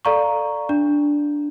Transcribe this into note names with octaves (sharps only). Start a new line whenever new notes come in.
A4 D5 F5 A#5 C#6
D4